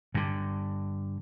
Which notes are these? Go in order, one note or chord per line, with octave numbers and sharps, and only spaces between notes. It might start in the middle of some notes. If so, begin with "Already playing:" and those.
G2 D3